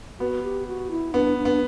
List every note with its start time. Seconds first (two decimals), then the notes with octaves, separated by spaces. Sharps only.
0.20 B3 F#4
0.43 G4
0.67 F#4
0.91 E4
1.14 B3 D4
1.38 D4
1.45 B3